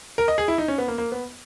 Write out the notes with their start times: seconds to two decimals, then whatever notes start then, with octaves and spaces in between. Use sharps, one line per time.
0.18 A#4
0.28 D#5
0.38 G#4
0.48 E4
0.58 D#4
0.68 C#4
0.78 B3
0.88 A#3
0.98 A#3
1.12 B3